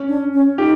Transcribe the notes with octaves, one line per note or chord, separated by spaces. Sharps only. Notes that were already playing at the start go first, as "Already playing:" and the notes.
Already playing: C#4
D4
C#4
D#4 G4